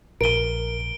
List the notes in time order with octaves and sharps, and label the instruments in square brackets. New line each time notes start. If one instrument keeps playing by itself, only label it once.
[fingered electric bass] A#1 [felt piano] A#4 D#7 [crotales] D7 G7